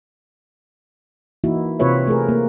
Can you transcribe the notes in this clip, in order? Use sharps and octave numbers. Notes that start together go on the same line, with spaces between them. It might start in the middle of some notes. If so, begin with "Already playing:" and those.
E3 A#3 D#4 E4 F#4
C3 C4 F4 B4 C#5 E5
A3 G#4 A#4
A#3